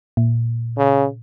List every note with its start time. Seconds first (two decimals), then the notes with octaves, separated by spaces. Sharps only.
0.17 A#2
0.77 C#3